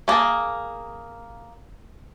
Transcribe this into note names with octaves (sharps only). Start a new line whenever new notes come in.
A3 A#3 G#4 A#4 A5